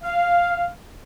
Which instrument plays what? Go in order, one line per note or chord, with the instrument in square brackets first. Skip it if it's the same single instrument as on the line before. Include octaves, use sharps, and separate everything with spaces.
[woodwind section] F5